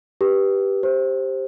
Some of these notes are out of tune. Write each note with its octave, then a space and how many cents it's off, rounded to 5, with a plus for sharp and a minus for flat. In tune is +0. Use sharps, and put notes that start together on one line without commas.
G4 +0 B4 -15
G4 +0 C5 +10